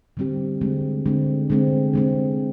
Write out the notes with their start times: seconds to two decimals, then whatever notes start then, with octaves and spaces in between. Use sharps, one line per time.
0.17 D3 G3 C4 G4
0.61 D3 G#3 C4
1.06 D3 G#3 C4
1.50 D3 G#3 C4
1.93 D3 G#3 C4